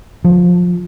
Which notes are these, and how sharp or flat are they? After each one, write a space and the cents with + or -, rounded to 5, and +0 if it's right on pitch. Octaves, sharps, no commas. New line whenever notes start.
F3 +20